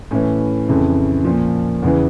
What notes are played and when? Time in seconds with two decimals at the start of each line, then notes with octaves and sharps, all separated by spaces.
0.11 A2 E3 C#4
0.69 F2 C#3 E3
1.25 A#2 F3
1.82 E2 C#3 E3